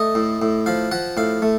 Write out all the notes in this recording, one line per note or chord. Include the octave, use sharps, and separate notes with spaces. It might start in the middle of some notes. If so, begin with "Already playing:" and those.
Already playing: A3 D#5
A2
A2
F3 F5
F3 F#5
A2 F5
A3